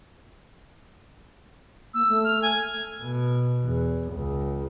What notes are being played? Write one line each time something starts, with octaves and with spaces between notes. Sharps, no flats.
A#3 E6
A3
F6
G#5
B2
E2
C#2